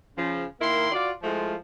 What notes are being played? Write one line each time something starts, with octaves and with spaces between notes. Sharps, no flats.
C#3 F3
D#3 A#3 E4 A#4 C6
F4 F#4 D5
F3 G#3 A3 E4 F4